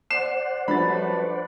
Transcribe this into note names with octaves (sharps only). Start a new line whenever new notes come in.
C5 D5 F#5 C7 E7
F#2 F3 G3 A3 D4 B4 B5 A6